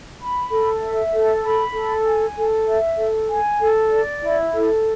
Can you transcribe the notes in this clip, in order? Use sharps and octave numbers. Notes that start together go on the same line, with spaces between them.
B5
A4
E5
A4
B5
A4
G#5
A4
E5
A4
G#5
A4
D5
E4
A4